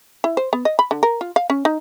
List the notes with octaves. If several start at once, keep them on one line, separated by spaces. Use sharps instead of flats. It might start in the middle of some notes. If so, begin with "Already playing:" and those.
E4
C5
B3
D#5
B5
D3
A#4
F4
F5
C#4
D#4